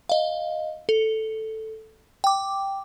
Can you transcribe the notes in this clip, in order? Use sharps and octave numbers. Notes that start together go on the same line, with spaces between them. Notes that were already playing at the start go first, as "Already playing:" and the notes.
D#5 F5
A4
G5 D6